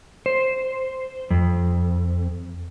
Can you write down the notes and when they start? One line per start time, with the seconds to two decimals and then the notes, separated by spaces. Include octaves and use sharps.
0.26 C5
1.31 F2